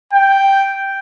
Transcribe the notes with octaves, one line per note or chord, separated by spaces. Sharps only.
G5